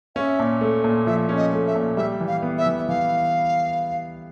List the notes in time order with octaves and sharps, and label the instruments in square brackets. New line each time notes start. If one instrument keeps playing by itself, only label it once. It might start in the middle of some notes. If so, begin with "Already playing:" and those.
[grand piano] C#4 [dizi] E5 F5
[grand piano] A#2
A3
A#2
[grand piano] F3 [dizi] E5
[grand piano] C#4
[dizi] D#5
[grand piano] A3
[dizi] E5
[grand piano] A#2
[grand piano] G3 [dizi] E5
[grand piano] E3
[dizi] F5
[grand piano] B3
[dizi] E5
[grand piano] E3
[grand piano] E3 [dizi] F5